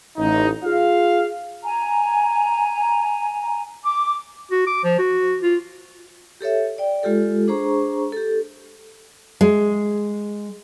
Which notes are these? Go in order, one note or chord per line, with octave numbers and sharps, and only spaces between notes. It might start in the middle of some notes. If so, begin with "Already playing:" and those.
A1 D#4
F4 G#4 F5
G#5 A#5
D6
F#4
D6
F3
F#4
F4
G4 A4 C#5 E5
D5 G5
G#3 F4 G4 A4
D4 G#4 C5 A#5 C#6
G4 A4
G#3